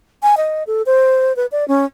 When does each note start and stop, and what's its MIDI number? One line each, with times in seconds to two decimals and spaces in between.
0.23 0.35 80
0.37 0.63 75
0.67 0.82 69
0.86 1.35 72
1.36 1.46 71
1.52 1.67 74
1.68 1.85 61